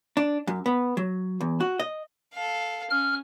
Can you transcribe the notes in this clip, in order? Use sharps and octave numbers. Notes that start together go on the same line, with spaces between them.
D4
F#2
B3
F#3
E2
F#4
D#5
A4 F5
C#4 F6